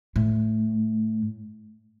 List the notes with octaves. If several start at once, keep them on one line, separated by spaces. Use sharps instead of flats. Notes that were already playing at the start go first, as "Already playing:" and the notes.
A2